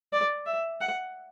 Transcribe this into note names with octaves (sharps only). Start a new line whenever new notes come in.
D5
E5
F#5